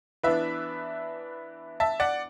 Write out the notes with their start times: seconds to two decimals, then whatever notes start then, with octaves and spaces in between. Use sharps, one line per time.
0.24 E3 B3 D4 B4 E5
1.80 E5 A5
2.00 D5 F#5